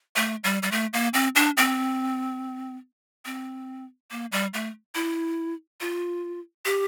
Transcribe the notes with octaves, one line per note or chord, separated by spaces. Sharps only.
A3
G3
G3
A3
A#3
C4
D4
C4
C4
A#3
G3
A3
E4
F4
G4